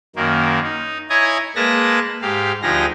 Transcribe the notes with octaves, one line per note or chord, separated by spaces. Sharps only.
F#2 D#3 A#3
D#4
E4 C#5 D#5 G#5 A#5
G#3 A#3 B4 A5 A#6
G#2 G4 F5
D2 F3 D#4 G4 G#4 A#6